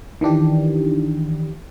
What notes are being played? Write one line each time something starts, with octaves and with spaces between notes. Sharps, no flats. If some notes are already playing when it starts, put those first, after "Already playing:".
D#3 E3 D4 G4